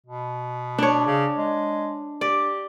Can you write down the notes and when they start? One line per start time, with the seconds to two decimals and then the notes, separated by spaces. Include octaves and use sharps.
0.06 B2
0.78 D4 C#5
1.06 C#3
1.37 G#3
2.21 G4 D5